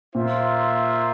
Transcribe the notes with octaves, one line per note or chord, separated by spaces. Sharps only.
A#2 A#3 F4 C5 E5